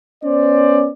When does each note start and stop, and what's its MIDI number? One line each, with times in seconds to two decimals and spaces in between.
0.24 0.90 59
0.24 0.90 61
0.24 0.90 72
0.24 0.90 74